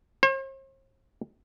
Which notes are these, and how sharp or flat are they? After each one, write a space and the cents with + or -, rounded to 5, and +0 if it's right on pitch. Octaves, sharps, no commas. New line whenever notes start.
C5 +45